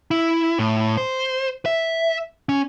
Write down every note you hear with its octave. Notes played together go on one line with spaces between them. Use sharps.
E4
A2
C5
E5
C#4